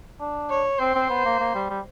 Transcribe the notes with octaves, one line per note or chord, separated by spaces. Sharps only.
D4
C#5
C4 C5
C4
B3
A#3
A#3
G3
G3